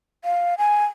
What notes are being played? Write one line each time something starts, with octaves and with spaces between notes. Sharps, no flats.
F5
G#5